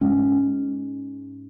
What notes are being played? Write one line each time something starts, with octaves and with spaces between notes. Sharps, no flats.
G#2 G#3 C#4